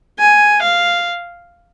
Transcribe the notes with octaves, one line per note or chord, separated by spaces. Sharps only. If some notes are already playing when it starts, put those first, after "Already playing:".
G#5
F5